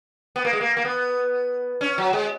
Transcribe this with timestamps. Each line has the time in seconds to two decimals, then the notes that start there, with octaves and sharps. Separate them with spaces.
0.36 B3
0.45 A#3
0.53 G#3
0.61 A#3
0.77 A#3
0.85 B3
1.81 C#4
1.98 F#3
2.13 G#3